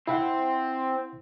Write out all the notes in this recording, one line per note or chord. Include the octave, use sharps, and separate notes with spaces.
C4 E4 E5 F#5